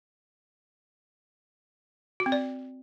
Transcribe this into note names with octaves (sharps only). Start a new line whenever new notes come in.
F#4
C4
D5